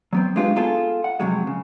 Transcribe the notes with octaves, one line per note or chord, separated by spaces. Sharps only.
F#3 B3 C4
G#3 D4 F4 G4 A4 B4
B3 D#4 F4 G#4 A4
F#5
F2 C3 F#3 G#3
C#3